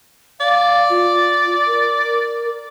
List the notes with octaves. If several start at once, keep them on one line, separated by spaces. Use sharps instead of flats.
D5 F5
F4
A#4